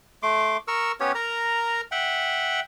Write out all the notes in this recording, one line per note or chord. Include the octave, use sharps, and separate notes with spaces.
A3 C6 D6
A#4 C#6 E6
B3 C#4 G4 C#5
A#4 A#5
E5 F#5 G5